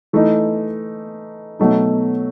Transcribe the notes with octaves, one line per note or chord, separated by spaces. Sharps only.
E3 A3 D#4
B2 F#3 A3 D#4